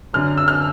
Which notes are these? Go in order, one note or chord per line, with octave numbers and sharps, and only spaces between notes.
F#2 D3 F#3 F6
E6
F6